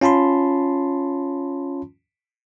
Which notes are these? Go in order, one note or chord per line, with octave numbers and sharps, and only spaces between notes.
C#4 F4 A5 B5 C6